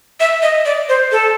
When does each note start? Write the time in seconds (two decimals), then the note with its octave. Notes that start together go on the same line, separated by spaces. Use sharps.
0.20 E5
0.42 D#5
0.66 D5
0.89 C5
1.12 A4